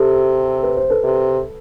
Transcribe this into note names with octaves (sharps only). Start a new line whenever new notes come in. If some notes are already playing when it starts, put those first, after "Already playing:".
Already playing: C3 G4 A4
B4
C5
A4 B4
C3